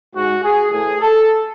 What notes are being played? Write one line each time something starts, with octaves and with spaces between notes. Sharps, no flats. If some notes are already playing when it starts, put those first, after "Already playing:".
G#2 G#3 F#4
G#4
A2 E3 A3 G#4
A4